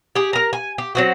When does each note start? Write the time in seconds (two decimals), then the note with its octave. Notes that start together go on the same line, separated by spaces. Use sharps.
0.15 G4 G#4
0.33 A#4 A#5
0.53 G#5
0.78 G4
0.95 F#3 C4 F#4